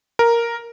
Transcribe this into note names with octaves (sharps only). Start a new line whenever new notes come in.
A#4